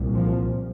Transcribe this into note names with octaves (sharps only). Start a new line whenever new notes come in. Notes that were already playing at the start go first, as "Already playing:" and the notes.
Already playing: C2 A#2
F3